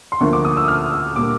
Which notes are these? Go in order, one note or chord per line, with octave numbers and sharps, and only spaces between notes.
C6
D2 D3 F3 A#3 C#6
D6
D#6
E6
F6
E6
A#2 G3 A#3 D6